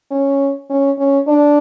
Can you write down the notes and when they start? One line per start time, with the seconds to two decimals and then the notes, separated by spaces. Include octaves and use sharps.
0.11 C#4
0.70 C#4
0.98 C#4
1.27 D4